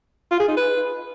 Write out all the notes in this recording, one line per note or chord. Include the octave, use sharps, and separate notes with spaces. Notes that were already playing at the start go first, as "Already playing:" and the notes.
F4
G#4
D#4
B4